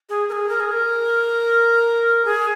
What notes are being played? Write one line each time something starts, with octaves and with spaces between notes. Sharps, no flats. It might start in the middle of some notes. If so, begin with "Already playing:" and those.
G#4
A#4
G#4
A#4
G#4
A#4
G#4